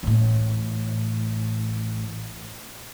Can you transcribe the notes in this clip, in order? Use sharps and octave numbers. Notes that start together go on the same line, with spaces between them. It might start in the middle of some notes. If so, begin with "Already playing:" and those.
A1 A2